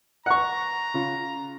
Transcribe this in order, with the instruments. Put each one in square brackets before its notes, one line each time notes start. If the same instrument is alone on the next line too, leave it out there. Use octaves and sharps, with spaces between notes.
[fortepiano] F#5 C#6 [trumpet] A#5
[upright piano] C#3 F4